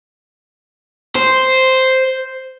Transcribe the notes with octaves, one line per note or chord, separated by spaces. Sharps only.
C5